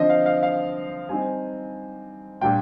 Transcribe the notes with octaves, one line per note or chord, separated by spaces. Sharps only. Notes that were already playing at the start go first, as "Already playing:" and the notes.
Already playing: D3 F3 C4 C5 D#5
F5
F5
F5
G3 C4 D#4 G#5
A#2 G3 D4 F4 G5